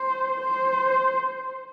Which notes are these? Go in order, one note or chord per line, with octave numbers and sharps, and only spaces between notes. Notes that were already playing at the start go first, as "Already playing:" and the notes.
Already playing: C5
C5